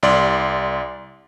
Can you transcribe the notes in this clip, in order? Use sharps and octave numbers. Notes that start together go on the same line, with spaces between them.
C2 D5 C6